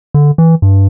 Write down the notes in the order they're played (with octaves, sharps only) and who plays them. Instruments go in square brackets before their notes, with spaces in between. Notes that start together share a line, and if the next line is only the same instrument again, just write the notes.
[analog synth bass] D3
E3
G2